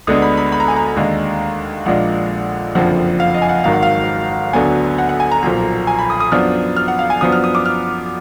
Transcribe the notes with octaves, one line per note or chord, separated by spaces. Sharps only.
D2 D3 G#3 B3 D4 D#6
B5
B5
B5
A#5
G#5
A#5
D#2 D3 G#3
A#1 A#2 G#3 D4 F#5
F#1 F2 D3 F3 F#5
F5
D#5
G#5
F#5
G#1 G#2 D#3 F#3 F5
F#5
F5
D2 D3 F#3 B3 G#5
F#5
F#5
G#5
A#5
B1 A#2 F3
G#5
B5
D#6
D#6
F#2 F3 B3 D4 F6
F6
F#5
F5
G#5
F#2 F3 B3 D4 D#6
F6
D#6
D6
F6